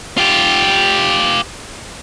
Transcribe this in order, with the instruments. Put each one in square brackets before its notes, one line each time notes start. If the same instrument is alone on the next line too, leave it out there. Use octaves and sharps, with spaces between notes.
[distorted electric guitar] F4 G4